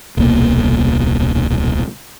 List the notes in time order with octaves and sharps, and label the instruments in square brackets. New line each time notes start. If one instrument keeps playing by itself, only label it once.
[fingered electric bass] D#1 C2 B2 A#3